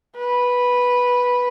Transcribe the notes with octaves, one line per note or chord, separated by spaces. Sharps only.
B4